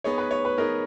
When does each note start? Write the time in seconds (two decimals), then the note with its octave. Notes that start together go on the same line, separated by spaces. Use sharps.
0.04 B3 D#4 G#4 C#5
0.18 B4
0.31 C#5
0.45 B4
0.57 B3 D#4 G#4 A#4